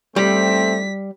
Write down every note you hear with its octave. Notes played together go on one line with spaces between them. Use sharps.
G3 A3 C4 B6